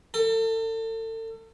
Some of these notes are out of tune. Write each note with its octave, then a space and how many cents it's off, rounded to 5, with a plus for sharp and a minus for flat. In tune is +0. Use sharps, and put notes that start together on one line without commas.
A4 +35